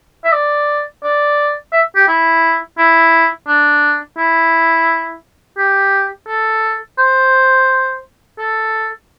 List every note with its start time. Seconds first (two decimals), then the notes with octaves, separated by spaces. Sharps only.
0.25 E5
0.33 D5
1.03 D5
1.73 E5
1.96 G4
2.08 E4
2.78 E4
3.48 D4
4.18 E4
5.58 G4
6.28 A4
6.99 C5
8.39 A4